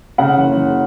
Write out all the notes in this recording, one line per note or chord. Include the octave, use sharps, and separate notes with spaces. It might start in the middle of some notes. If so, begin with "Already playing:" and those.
C#3 F#5
F#1
F#1